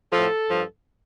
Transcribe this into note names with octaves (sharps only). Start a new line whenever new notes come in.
A2 F3 A4
G2 F3